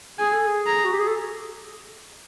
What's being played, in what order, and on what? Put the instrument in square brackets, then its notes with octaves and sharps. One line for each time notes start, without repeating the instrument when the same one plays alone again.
[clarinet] G#4 [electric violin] G#5
[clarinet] A4
G#4
[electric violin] A#5
[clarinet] F#4
G4
G#4
A4